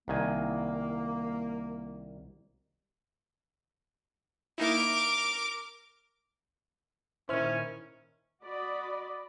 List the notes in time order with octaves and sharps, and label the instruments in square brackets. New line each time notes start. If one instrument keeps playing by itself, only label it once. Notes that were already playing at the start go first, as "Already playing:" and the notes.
[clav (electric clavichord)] C2 D#3 G#5 [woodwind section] A#3
[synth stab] A#3 D#4 E4 [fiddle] A#4 D6
[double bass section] A#2 D#3 [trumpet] C#4 [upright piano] E4 [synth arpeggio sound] C5 F6
[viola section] F#4 D5 D#5 B5